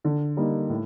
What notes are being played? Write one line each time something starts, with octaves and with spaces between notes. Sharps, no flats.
D3
G3 A#3 D#4
A2